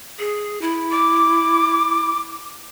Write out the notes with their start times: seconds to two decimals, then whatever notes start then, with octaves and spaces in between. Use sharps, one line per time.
0.19 G#4
0.62 E4
0.92 D6